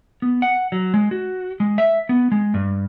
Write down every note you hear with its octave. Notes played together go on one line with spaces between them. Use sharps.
B3
F#5
F#3
G#3
F#4
G#3
E5
B3
G#3
G2